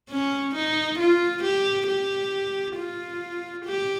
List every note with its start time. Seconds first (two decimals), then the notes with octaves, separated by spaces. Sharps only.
0.10 C#4
0.55 D#4
0.99 F4
1.43 G4
1.88 G4
2.76 F4
3.66 G4